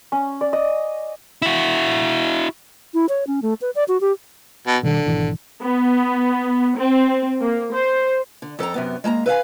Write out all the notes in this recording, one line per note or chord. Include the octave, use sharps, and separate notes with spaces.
C#4
D5
D#5
E4 F#4
E4
C#5
C#4
A3
B4
D5
F#4
G4
B2
B2 D3 D#3 G3
G#1 B2 E3
B3
C4
A#3
C5
D3
F2 A4 G5 A#5
F#2 C3 B3
G#3 A#3 A5 A#5
B4 E5 F5 G#5